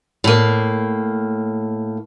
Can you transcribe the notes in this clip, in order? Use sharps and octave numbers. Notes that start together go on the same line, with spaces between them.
A2 A#3